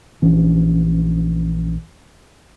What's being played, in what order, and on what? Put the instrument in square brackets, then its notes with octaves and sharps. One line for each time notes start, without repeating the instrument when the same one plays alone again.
[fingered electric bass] A#1 E3 C#4 D4